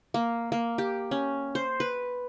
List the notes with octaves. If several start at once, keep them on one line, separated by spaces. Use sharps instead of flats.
A#3
A#3
G4
C#4
C5
B4